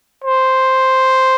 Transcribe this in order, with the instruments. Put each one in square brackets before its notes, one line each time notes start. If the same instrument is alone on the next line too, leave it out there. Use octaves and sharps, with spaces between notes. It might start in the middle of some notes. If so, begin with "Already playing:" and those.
[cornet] C5